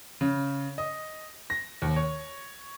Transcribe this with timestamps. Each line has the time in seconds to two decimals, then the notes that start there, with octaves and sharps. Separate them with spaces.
0.21 C#3
0.78 D#5
1.50 A#6
1.82 D#2
1.96 C#5